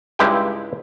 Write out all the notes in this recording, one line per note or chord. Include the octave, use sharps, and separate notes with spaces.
C#2 G2 G#3 E4 G4 G5